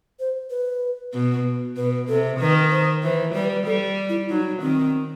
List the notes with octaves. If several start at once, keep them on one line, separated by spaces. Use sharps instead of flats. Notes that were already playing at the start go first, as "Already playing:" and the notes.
C5
B4
B2
B2 B4
C3 A4
D#3 B4
C5
E3 C5
G3 B4
G3 A4
E4
F#3 D#4
D#3 C4